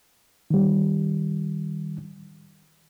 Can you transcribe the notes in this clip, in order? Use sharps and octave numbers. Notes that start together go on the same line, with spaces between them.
D#3 G3